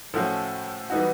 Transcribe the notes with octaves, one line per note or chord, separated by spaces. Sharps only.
A2 F3 A3 C#4 F#4
E3 G3 B3 D#4 F#4